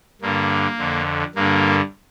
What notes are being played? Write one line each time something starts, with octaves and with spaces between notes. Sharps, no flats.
G2 D3 A#3
F2 D3
G2 D3 A#3